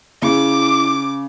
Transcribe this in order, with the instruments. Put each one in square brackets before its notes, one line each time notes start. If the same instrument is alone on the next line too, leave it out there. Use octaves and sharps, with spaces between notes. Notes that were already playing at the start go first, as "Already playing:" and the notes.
[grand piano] C#3 [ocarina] E4 [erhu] D6